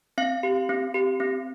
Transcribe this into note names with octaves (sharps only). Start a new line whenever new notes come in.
C4 F5
G4
C4
G4
C4